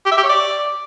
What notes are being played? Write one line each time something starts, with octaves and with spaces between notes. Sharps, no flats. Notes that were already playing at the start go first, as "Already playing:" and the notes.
G4
E5
G4
C#5
D5